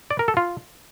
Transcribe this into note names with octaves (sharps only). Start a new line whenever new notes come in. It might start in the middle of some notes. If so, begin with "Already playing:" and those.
D5
A#4
A4
F4